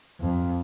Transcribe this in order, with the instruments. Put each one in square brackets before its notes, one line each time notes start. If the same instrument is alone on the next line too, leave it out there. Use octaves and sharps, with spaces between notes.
[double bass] F2